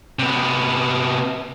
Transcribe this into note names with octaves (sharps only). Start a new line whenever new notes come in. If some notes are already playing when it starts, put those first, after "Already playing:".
C3 B3